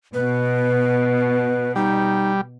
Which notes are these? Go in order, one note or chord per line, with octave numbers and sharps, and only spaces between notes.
B2 B4
G3 D#4